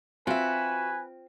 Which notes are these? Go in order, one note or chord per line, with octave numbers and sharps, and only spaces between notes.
C4 F4 F#4 B4 E5 G#5